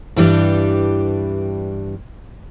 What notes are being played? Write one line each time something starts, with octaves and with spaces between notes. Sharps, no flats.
G2 E3 G3 D4 G4